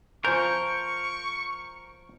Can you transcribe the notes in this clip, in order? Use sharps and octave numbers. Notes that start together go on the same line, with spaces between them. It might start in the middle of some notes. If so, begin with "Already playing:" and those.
F3 A#4 C5 G#5 C#6 G6